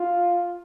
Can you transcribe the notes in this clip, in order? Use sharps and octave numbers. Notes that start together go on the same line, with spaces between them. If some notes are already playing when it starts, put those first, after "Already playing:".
Already playing: F4